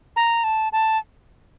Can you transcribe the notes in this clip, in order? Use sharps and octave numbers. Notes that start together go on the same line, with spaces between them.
A#5
A5
A5